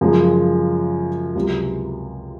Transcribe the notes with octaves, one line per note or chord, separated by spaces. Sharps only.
F#2 C#3 F3 G#3
C#2 C3 F#3